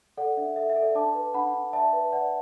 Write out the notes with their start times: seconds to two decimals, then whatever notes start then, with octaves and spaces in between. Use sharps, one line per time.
0.17 A4 D5 F#5
0.37 D4 E5
0.56 A4 E5
0.70 E5
0.76 A4
0.83 D5
0.95 D4 A5 D6
1.15 B4
1.34 D4 F#5 B5
1.54 D4
1.73 D5 E5 A5
1.93 B4
2.12 B4 D5 F#5